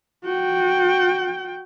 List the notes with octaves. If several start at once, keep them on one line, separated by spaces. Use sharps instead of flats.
F#4 G5